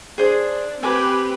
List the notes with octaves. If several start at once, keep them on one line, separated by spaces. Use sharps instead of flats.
D4 G#4 C5 D#6
C4 G4 B4 G#5 D6